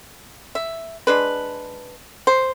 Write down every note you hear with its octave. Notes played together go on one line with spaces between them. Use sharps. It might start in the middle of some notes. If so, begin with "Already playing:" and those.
E5
G#3 D4 B4
C5